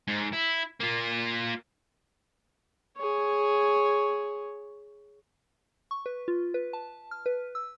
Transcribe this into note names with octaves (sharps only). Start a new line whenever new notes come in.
G#2
E4
A#3 F4
G#4 C#5
C#6
B4
F4
B4
A5
F6
B4
E6